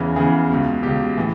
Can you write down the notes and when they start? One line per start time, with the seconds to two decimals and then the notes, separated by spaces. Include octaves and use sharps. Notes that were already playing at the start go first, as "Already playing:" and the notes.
Already playing: E2 C#3 E3
0.16 E2 C#3 E3 G#4
0.50 C#2 B2
0.83 C#2 B2 G4
1.17 A2 E3